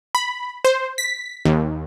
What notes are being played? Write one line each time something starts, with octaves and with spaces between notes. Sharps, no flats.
B5
C5
B6
D#2